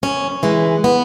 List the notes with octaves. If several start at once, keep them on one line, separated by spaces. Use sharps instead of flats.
F#2 C#4
E3 G#3
B3